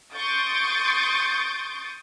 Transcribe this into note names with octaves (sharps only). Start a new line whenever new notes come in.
C6 C#6 D#6 G6 A6 D7